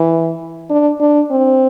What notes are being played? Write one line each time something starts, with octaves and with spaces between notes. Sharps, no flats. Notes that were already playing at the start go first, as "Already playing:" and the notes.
Already playing: E3
D4
D4
C4